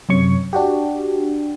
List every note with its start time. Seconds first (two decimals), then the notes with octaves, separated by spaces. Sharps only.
0.09 F#2 C3 C#5 C#6
0.53 D4 F#4 G4